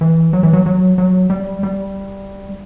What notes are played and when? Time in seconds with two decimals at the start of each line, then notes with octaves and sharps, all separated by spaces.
0.01 E3
0.33 F#3
0.43 E3
0.53 F#3
0.66 F#3
0.98 F#3
1.30 G3
1.63 G3